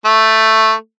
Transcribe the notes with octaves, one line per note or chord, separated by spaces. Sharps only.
A3